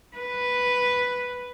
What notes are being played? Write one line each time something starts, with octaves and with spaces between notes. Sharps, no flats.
B4